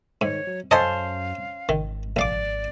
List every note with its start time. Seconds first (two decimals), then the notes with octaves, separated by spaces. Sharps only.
0.21 G#2 D#3 C#5
0.47 F#3
0.71 F#2 C#4 A4 C5 D#5 F5 A5
1.69 G#1 D#3
2.16 A#1 D5 F5 D6